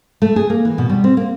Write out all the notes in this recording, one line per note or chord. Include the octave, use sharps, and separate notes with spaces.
A3
G#4
A#3
E3
B2
G3
C4
A#3